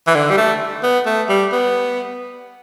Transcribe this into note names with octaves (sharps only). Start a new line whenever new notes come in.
E3
D3
G3
A3
B3
A3
G3
B3